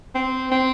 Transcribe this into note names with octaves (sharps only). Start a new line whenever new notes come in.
C4
C4